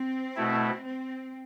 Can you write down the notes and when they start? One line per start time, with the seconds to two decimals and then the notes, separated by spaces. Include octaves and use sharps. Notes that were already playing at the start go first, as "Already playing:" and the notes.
Already playing: C4
0.36 B2 A3 E4
0.86 C4